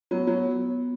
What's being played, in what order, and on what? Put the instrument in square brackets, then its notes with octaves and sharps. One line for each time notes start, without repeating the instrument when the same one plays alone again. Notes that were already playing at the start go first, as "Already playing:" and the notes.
[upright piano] F#3 [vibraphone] B3
[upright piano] F#3